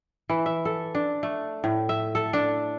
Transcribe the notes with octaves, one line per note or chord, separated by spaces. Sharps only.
E3
E5
A4
D4
A3
A2
E5
A4
D4